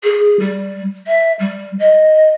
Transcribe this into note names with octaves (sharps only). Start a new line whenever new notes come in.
G#4
G3
E5
G3
D#5